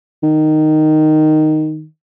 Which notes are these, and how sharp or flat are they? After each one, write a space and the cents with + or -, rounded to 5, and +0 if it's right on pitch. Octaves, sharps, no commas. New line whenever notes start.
D#3 -5